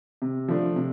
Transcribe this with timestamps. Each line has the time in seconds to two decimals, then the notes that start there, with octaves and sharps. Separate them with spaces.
0.22 C3
0.48 F3 A3 D4
0.76 C3